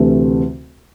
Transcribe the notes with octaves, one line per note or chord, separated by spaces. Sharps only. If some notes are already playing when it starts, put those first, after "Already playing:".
Already playing: D2 C3 E3 A3